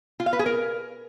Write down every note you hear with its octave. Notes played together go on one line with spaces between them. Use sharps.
F4
F5
B4
G#4
A#4